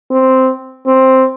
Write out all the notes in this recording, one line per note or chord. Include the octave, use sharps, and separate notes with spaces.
C4
C4